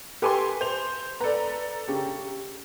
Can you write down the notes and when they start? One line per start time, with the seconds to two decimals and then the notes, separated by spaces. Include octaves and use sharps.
0.22 G4 A4 B4 G#5 C6 D6
0.61 C5 F7
1.21 A4 B4 D5 A#5
1.88 C#3 G4